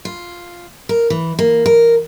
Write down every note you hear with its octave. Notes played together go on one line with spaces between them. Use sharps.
F4
A#4
E3
A#3
A#4